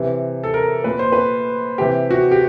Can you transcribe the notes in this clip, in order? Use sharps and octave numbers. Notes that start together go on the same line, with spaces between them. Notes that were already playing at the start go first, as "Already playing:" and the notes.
Already playing: C3 E3
A4
A#4
A#2 B4
C5
B4
C3 E3 G4
F#4
G4